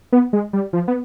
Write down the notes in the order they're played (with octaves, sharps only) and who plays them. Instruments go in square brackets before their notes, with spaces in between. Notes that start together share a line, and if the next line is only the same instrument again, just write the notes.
[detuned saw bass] B3
G#3
G3
F3
B3